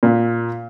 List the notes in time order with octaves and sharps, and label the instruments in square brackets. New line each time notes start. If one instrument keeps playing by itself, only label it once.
[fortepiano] A#2